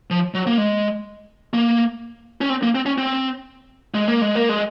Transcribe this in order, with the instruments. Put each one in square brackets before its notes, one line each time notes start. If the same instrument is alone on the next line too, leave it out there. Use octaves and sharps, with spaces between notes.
[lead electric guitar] F3
F#3
A#3
G#3
A#3
C#4
C4
A#3
C4
C#4
C4
G#3
A#3
G#3
A#3
G#3